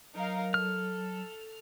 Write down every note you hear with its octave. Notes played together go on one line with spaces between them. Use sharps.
F#3 D#4 A#4 F5
A4 F6